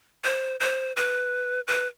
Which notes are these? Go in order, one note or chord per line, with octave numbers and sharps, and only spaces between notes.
C5
C5
B4
B4